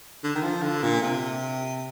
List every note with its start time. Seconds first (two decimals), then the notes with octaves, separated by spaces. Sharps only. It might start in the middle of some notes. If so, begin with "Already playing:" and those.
0.24 D3
0.35 D#3
0.43 F3
0.62 D3
0.83 A#2
1.02 C3